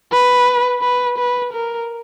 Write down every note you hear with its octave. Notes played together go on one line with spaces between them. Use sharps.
B4
B4
B4
A#4